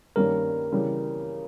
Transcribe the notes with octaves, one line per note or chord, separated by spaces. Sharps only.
G2 D#3 G3 A#3 C#4 A#4
C#3 E3 G3